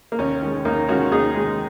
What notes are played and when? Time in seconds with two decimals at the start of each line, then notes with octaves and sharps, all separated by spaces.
0.12 A#3
0.19 D#2 C#4
0.42 D#3 G#3
0.65 D#2 A#3 D#4
0.88 D#3 G#3 C#4 F#4
1.11 D#2 D#4 G#4
1.35 D#3 G#3